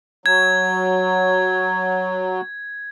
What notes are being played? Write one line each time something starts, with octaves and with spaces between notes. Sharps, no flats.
F#3 G#6